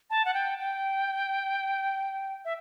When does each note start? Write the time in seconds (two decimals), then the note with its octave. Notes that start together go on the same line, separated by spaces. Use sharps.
0.10 A5
0.25 F#5
0.34 G5
0.59 G5
2.45 E5